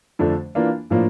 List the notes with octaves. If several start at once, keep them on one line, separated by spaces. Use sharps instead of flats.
F2 D3 F3 A3 D4
E3 A#3 D4 F4
A2 F3 A#3 D4 F4